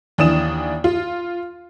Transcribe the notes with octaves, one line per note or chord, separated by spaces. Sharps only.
D#2 E3 D4 D#6 E7
F4